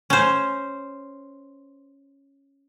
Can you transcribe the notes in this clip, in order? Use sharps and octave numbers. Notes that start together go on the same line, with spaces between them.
C#4 C5